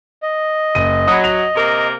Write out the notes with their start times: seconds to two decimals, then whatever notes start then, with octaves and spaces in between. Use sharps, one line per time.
0.23 D#5
0.75 F#1 D#7
1.07 F#3 B5 D#6
1.24 F7
1.55 C3 A#3 A#4